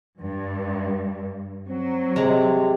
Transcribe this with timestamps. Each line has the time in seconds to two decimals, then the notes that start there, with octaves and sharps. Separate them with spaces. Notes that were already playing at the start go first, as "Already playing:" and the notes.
0.19 G2
1.68 F#3 C4
2.16 C3 G#3 D5 A#5